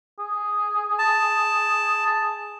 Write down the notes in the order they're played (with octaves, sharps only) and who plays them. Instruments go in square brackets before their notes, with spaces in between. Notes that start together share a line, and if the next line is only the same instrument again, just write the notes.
[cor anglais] G#4
[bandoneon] A5